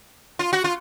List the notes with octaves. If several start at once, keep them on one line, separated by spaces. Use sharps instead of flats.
F4
F#4
F4